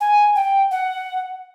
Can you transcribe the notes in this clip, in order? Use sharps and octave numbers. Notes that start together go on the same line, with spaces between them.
G#5
G5
F#5